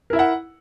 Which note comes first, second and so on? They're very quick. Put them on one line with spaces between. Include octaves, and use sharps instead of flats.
A#4 E4 E5 F#5